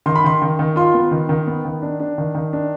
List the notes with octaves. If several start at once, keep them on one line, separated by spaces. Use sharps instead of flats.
D#3 C6
B5
D#3 C6
D#3
D#3
F4 C6
B3
D#3
D#3
B3
D#3
D4
D4
D#3
D#3
D4